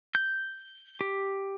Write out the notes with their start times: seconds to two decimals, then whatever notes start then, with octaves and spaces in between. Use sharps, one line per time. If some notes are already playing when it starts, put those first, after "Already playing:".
0.15 G6
1.01 G4